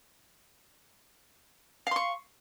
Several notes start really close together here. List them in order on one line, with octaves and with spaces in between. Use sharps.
F5 C6 C#6